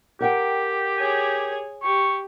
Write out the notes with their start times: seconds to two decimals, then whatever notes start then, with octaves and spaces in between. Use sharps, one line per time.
0.21 G4 A#4 F#5 G5
0.98 G#4 C#5
1.83 G4 C#6